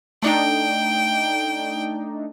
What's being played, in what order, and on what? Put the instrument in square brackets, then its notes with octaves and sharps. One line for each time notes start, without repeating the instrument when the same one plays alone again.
[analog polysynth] A3 D4 D#4 [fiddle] G5